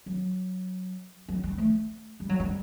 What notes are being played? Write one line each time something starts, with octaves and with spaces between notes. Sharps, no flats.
F#3
F#3
G3
A3
G3
F#3
G3